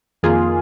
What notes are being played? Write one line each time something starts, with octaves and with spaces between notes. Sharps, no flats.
F2 D#3 A#3 F4 G#4